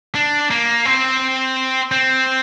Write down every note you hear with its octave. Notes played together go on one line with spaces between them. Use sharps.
D4
A#3
C4
C4